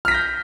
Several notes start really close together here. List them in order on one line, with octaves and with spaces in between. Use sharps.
F6 B6 A#6 G6